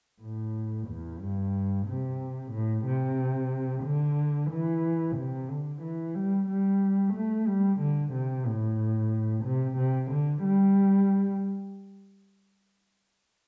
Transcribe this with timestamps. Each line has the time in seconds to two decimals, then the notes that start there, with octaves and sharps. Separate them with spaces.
0.21 A2
0.88 E2
1.21 G2
1.87 C3
2.52 A2
2.86 C3
3.84 D3
4.51 E3
5.17 C3
5.49 D3
5.82 E3
6.15 G3
6.48 G3
7.14 A3
7.47 G3
7.80 D3
8.13 C3
8.46 A2
9.44 C3
9.77 C3
10.11 D3
10.44 G3